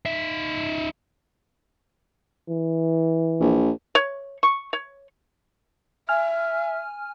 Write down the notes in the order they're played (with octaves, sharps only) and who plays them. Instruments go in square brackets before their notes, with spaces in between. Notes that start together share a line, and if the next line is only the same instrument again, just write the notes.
[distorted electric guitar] D#4 E5
[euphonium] E3
[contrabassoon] A#1
[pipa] C#5
C#6
C#5
[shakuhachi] E5 [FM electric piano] G#5 F6